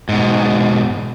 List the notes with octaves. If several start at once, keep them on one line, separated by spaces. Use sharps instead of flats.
G#2 B2